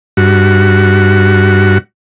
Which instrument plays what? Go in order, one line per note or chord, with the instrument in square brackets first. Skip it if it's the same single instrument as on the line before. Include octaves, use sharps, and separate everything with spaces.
[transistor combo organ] G2 F#4